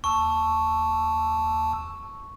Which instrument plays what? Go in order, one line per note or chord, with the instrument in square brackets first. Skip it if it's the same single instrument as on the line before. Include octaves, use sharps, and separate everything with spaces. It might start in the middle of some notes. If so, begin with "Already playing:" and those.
[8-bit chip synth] D#2 A5 E6 [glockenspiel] C#6